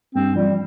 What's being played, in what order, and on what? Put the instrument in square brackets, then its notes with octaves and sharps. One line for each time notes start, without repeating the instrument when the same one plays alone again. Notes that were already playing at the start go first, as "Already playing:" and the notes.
[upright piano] G2 [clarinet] C4
[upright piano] F3 [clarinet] G3